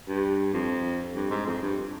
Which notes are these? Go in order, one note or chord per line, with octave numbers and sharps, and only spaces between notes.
G2
F2
G2
G#2
F2
G2